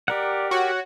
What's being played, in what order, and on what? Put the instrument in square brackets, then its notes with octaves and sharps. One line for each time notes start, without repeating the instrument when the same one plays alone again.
[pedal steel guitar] G4 A#4 F#5 [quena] D5
[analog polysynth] F#4 [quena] C#5